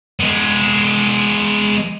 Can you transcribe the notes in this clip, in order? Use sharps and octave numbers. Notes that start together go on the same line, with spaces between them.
G#3 B3